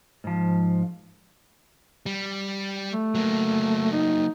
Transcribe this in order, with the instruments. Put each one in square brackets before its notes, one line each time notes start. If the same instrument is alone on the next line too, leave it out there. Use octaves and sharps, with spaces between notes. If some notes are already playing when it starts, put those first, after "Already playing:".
[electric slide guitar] G#2 F3
[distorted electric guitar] G3
[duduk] A3
[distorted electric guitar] F#3 A#3
[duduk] D#4